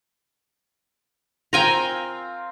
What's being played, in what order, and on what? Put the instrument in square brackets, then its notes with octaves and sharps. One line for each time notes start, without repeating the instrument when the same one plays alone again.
[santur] C4 F4 A#4 [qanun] G5 G#5 A#5